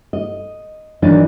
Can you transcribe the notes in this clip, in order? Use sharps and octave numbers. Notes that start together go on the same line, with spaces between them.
D#5
D#3 E3 F#3 D4 D#4 D5